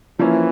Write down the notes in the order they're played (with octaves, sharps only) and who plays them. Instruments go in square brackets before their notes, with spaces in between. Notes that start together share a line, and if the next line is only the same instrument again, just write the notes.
[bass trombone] E3 [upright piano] F3 A#3 C#4 E4